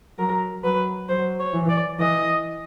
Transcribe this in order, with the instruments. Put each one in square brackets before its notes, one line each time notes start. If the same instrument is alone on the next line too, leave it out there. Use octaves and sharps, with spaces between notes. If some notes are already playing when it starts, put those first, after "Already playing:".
[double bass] F#3 [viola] A#4
[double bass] F#3 [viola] B4
[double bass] F#3 [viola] C5
[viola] C#5
[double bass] E3
[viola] D5
[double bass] E3 [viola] D#5